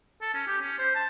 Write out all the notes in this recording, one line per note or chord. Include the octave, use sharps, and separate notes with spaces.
A4
C#4
G4
C#4
C5
A5